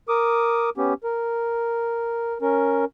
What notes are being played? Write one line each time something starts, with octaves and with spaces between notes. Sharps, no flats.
A#4 D6 D#6
B3 C#4 G4
A#4
C#4 A#4